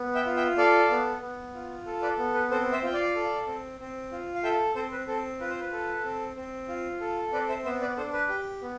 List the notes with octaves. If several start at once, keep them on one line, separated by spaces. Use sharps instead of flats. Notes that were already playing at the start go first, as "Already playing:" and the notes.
Already playing: B3
E5 G5
F4
E5 G5
A4 D5 F5
B3
B3
F4
A4
B4 D5
B3
B4
C4 A4 C5
C5 E5
F4 G5
D5 F5
A4
C4
C4
F4
F5
A4 E5 G5
C4 A4 C5
B4
C4 A4
F4 B4
C5
B4
A4
C4
C4
F4
A4
C4 B4 D5
C5 E5
B3 C5 E5
B4 D5
D4 A4 C5
B4
G4
B3